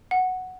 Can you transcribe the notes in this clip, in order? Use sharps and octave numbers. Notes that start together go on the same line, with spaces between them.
F#5